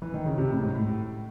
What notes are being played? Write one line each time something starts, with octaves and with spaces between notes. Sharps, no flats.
E3
D#3
C#3
C3
A2
G#2
A2
A2